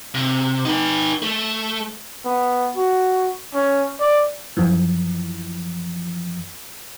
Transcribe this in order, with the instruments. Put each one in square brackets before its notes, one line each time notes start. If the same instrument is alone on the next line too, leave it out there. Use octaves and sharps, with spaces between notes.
[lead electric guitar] C3
D#4 B4
A3
[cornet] B3
F#4
C#4
D5
[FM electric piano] F#2 E3 F3